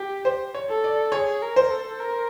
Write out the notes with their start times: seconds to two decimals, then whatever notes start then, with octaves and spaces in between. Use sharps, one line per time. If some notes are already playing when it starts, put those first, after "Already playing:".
Already playing: G4
0.25 C5
0.55 C#5
0.69 A4
0.84 D5
1.12 G#4 C#5
1.42 A#4
1.56 C5
1.70 A4
1.99 A#4